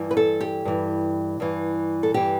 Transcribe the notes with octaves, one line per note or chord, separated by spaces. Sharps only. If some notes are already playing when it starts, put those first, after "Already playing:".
Already playing: G2 E3
B4
A4
G4
G2 E3
G2 E3
A4
G2 E3 G4